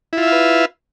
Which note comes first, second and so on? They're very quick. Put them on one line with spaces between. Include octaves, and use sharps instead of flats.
E4 F4 E5 F5 B4